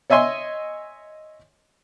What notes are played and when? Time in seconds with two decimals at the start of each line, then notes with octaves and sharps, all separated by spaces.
0.10 C#5 D#5 E5 G#5 C6